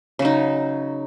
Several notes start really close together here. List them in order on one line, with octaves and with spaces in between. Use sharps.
C#3 F#3 D#4